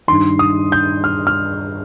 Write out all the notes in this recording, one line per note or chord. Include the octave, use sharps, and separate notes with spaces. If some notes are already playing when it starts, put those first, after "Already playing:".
G2 D#3 C6
D#6
G6
F6
F6